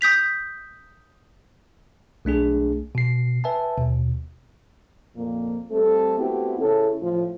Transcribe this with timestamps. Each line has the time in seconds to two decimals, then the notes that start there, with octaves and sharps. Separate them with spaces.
0.01 D#6 G6 B6 F7
2.25 B1 A3 D4 G#4
2.95 B2 C7
3.44 B4 E5 G#5 A5
3.78 D#2 B2
5.17 F2 A#2 F3 A#3
5.72 G3 A3 C4 A4
6.19 A3 B3 C4 E4 F#4 G4
6.60 C#3 C#4 E4 A4
7.02 A2 F3